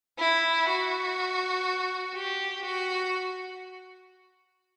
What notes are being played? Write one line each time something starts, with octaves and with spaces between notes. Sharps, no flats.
E4
F#4
G4
F#4